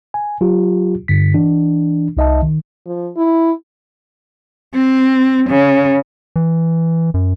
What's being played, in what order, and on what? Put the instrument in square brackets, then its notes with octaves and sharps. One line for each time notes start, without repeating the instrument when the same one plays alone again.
[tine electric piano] G#5
F#3 F4 G4
G2 D3 B6
E3 D4
C2 D#4 D#5 E5 A5
D#3
[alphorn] F3
E4
[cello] C4
C#3
[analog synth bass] E3
F#2